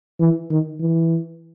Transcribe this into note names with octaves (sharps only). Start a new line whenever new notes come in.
E3
D#3
E3